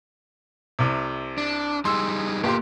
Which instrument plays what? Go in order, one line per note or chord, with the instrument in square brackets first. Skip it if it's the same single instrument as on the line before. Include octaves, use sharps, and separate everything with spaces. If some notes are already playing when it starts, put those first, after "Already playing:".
[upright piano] C2 C3
[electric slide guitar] D4
[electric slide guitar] G3 D#4 G#4 [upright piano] C6 E6
[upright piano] G1 G4 C6 [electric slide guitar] A#3 F4